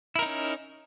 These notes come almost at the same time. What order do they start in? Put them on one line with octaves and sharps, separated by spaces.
E4 A#4 D#4 C#4